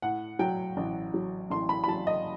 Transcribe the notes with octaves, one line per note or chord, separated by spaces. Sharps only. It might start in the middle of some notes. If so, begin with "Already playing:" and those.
A2 F#5
F#3 G5
A1
F#3
A1 C6
B5
B5
F#3 A5
D#5